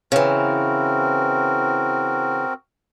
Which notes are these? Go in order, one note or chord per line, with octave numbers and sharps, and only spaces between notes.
C#3 E3 C4 F#4 A#4